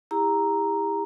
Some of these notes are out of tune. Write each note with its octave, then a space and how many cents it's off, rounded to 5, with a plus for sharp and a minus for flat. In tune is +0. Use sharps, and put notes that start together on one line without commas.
E4 +0 G4 +45 A#5 +0